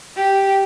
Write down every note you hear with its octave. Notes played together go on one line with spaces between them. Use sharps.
G4